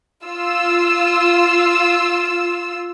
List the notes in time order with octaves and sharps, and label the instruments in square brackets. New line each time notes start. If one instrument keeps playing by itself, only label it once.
[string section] F4 E6